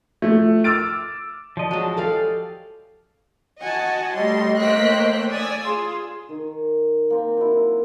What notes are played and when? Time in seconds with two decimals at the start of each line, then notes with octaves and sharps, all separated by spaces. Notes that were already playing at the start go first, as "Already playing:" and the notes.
0.22 F3 A3
0.64 D6 E6 F6 A6 D7
1.57 F3 D5 D#5 A5
1.71 F#3 G#3
1.97 G4 A4 D5 F5
3.61 F#4 D#5 F#5 G#5 A5
4.15 G3 A3 C#5 D#5 C6
4.60 A#3 C5 G5 F#6 B6
5.31 D5 G#5 D#6 E6
5.65 F4 G#4 C6
6.29 D#3
7.10 A#3 C4
7.37 F#3 E4